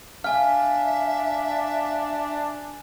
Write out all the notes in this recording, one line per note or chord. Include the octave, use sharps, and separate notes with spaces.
D4 E5 F5 G#5 F6